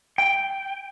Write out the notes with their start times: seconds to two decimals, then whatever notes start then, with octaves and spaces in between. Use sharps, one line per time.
0.18 G5